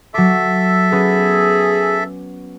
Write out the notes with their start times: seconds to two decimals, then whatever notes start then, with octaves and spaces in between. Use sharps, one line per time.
0.14 F#3 A4 E5 D6
0.92 B3 C#4 G#4